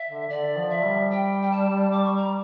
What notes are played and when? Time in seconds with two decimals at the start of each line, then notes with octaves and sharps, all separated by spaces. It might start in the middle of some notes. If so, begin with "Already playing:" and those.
Already playing: E5
0.09 D3
0.30 D3 D5
0.57 F3
0.70 E5
0.84 G3
1.11 G5
1.42 G5
1.51 A5
1.92 D6
2.05 C#6
2.17 A#5